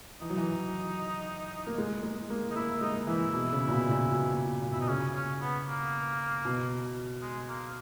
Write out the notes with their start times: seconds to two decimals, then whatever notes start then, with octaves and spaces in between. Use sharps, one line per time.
0.21 E3 D#4
0.30 F#3
0.38 E3
1.67 A#3
1.78 G#3
2.03 G#3
2.30 A#3
2.51 D#4
2.56 A#3 E4
2.81 G#3 D#4
3.07 E3 E4
3.34 B2
3.53 C#3
3.68 A#2
3.72 B2
3.91 A#2
4.12 B2
4.63 A#2
4.72 B2 E4
4.81 D#4
4.89 C#3 C#4
5.15 C#4
5.41 B3
5.66 A#3
6.45 B2
7.22 G#3
7.49 A#3